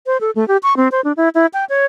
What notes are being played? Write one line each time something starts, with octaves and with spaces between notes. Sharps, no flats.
C5
A4
A3
G4
C#6
C4
C5
D4
E4
E4
G5
C#5